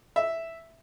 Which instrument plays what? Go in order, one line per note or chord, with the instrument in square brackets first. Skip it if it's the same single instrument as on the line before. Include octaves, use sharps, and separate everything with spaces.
[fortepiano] E5